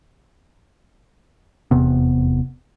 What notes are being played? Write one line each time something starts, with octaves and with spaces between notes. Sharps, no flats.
F1 E2 C3 B3